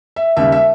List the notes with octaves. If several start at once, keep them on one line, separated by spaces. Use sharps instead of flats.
E5
D#2 C#3 G3 E5
E5